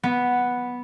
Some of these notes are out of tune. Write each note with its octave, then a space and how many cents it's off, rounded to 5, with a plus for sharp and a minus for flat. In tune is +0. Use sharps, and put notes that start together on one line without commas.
B3 -5